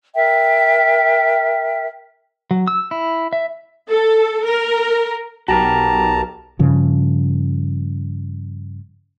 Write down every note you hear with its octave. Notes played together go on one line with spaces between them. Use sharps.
A#4 E5 G5
F#3
E6
E4
E5
A4
A#4
B1 F#4 G4 A#4 A5 A#5
G2 C#3 F3